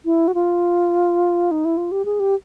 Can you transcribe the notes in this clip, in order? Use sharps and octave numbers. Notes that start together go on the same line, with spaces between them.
E4
F#4
F4
D#4
E4
F4
G4
G#4
G4